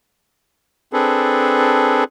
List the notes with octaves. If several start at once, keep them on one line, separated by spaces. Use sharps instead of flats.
C4 D4 G#4 A4 B4